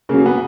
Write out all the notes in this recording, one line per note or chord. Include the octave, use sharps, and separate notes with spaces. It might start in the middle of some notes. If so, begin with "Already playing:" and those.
C#3 F#3 A#3
B3